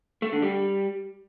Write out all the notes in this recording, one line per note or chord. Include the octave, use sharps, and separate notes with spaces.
A3
D3
G3